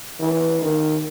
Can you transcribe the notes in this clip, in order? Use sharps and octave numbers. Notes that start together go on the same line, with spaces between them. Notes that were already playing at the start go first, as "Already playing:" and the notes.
E3
D#3